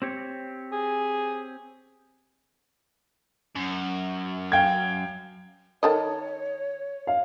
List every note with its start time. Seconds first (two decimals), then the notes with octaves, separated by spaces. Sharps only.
0.02 C4 G4 C#5
0.72 G#4
3.56 F#2
4.52 F5 G5 G#6
5.83 D#3 A4 C#5 D#5
7.07 F5